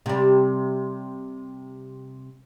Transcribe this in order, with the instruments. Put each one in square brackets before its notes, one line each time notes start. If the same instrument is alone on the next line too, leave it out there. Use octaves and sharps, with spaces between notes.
[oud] C3 G3